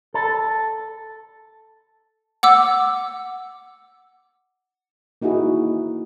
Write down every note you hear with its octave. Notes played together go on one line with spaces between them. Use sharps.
A4
F#5 D6 E6
A#3 D#4 E4 F#4 G#4